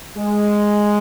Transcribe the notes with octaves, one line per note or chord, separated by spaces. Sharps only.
G#3